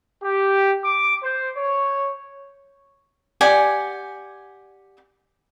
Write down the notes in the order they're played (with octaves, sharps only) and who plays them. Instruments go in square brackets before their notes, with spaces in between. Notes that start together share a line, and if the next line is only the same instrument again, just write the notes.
[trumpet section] G4
D6
C5
C#5
[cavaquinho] G4 D5 F#5 G#5